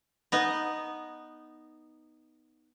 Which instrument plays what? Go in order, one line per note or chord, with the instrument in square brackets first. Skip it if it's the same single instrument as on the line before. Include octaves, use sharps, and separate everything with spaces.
[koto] B3 D#4